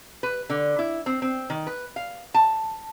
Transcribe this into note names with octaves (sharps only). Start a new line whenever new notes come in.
B4
D3
E4
C4
C4
D#3
B4
F5
A5